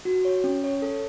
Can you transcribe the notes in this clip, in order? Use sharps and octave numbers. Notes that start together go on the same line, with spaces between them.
F#4
C#5
C#4
C#5
A4